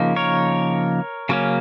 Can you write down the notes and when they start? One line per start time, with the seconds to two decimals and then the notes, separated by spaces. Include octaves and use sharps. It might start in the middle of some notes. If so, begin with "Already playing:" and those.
Already playing: C#3 F3 A#3 D#4
0.16 A#4 C#5
1.29 C#3 F#3 A#3 C#4